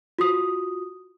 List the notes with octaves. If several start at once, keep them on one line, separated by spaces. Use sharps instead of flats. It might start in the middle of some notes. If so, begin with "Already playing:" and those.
F4 F#4 D#6